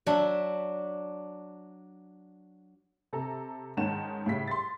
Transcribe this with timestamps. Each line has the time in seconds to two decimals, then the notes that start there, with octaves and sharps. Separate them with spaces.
0.07 F#3 D4 E5
3.13 C3 A4 A#5
3.77 G#2 D#3 C#4 F#5 A5 E7
4.26 A2 C#3 G3 B6
4.48 C6 A6